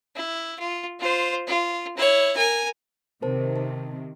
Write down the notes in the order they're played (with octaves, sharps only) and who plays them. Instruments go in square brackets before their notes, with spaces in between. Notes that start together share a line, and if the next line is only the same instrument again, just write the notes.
[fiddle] E4
F4
F4 C5
F4
E4 C#5
A#4 G#5
[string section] C3 D#3 [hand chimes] A#4 C5 A5
[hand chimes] A5